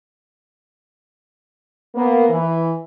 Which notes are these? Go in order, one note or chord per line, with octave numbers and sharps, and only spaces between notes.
A#3 B3
E3